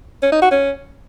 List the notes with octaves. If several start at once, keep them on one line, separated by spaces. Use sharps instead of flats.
C#4
D#4
F#4
C#4